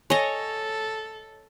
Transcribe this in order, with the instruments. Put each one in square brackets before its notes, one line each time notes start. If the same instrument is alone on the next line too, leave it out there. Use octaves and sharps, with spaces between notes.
[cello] A4 [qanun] C#5 D#5 [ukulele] G#5